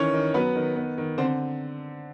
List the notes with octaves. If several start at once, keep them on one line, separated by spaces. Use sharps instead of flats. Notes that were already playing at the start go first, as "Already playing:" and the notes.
Already playing: D#3 E3 C#4 C#5
D#3
F#3 B3 B4
D#3
B3
D#3
D3 C4 C5